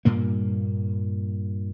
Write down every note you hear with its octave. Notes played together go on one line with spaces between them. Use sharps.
G2 A#2 A#3